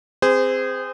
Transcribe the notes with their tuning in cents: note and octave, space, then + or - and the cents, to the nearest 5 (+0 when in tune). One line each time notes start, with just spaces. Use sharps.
C4 +0 G#4 -20 C5 -30